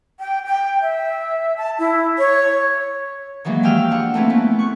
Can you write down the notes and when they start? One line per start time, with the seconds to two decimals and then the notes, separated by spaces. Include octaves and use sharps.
0.20 G5
0.46 G5
0.81 E5
1.57 A5
1.79 E4
2.18 C#5
3.44 D#3 E3 F#3 G#3 A#3
3.63 F3 F4 G4 G5 E6 F6
3.91 D4 F4 F#5
4.14 A3 A#3 C4 C#4 E4 B4
4.30 A3 B3 C#4
4.59 C#6 F#6